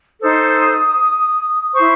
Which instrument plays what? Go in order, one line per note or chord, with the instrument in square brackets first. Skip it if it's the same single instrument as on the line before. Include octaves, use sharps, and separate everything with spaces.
[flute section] D#4 A4 C5 D#6
E4 C5 C#6